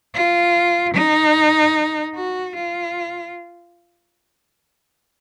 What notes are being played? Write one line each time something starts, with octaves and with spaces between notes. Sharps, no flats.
F4
D#4
F#4
F4